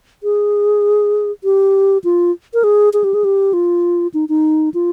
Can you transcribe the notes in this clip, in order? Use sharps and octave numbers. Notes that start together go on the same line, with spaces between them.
G#4
G4
F4
A#4
G#4
G#4
G4
G#4
G4
F4
D#4
D#4
F4